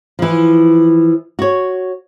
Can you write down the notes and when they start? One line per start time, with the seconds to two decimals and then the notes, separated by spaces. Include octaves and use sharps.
0.19 E3 F3
1.39 F#4 C#5